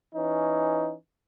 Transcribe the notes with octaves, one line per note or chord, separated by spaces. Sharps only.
E3 C#4 D#4